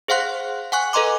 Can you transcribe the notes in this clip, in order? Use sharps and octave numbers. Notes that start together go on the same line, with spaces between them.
G#4 C5 F5 F#5 C6 F#6
F#5 G#5 C#6 F#6
A4 B4 D#5 A#5 C6 D6